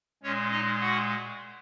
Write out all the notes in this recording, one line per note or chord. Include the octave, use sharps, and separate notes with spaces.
A#2 G#3 C#4 C#5
D#4 D#5
F#4 F#5